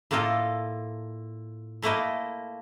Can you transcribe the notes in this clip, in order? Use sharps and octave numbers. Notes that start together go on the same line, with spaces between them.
A2 A#3 F4 A4 D#5
A#2 A3 A#3 E4 D#5